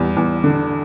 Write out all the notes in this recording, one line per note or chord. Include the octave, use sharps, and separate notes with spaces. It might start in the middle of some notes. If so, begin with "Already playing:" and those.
Already playing: E2 G3
E2
D3